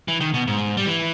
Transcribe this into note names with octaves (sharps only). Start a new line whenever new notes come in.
E3
D#3
B2
G#2
G3
E3